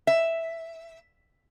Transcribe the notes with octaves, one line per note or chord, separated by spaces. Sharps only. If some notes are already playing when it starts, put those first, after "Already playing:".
E5